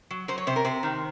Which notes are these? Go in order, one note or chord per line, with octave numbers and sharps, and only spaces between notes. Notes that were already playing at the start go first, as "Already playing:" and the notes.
F#3
F#3 C5
C#5
C3 C5
A#4
C3 C5
D#3